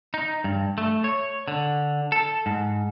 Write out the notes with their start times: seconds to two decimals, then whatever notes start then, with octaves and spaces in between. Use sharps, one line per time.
0.14 D#4
0.44 G2
0.78 A3
1.04 C#5
1.48 D3
2.12 A4
2.46 G#2